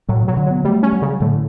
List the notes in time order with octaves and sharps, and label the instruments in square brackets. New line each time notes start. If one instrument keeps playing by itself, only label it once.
[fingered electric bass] A2 [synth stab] F#3
[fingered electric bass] B2
[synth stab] F#3
[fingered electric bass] D3
[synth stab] F#3 [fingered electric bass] B3
[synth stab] G3 [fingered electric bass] A3
[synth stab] C#4
[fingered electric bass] F#3
[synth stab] C#3
[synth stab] A2 [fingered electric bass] D3